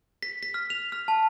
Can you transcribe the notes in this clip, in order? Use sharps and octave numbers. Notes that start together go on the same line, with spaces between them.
B6
B6
F6
F7
F6
A5